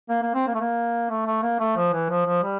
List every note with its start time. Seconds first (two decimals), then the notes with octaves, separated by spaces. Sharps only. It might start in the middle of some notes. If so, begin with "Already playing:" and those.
0.10 A#3
0.23 A#3
0.35 C4
0.48 A#3
0.55 A3
0.61 A#3
1.10 A3
1.27 A3
1.43 A#3
1.60 A3
1.77 F3
1.93 E3
2.10 F3
2.26 F3
2.43 G3